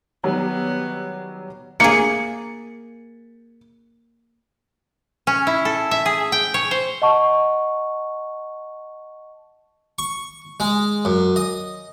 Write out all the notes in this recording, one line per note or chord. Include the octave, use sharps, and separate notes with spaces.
D#3 F#3 G3 B3
A#3 G#4 C#7
C#4
E4
A4
E5
G#4
G5
C#5
C5
D#5 F#5 A5 C#6
C#6
G#3
F#2
D#5